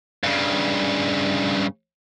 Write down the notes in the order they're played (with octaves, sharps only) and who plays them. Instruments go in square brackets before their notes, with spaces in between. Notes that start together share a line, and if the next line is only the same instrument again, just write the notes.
[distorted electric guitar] G2 C#3